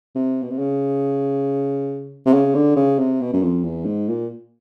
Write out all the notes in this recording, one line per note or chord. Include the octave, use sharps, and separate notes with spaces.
C3
B2
C3
C#3
C3
C#3
D3
C#3
C3
B2
F#2
F2
E2
G#2
A#2